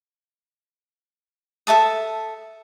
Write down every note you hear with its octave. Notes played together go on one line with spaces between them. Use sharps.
A4 E5 A5 D#6